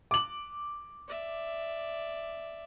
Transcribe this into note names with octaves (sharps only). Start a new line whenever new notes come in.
D6 F#7
D5 E5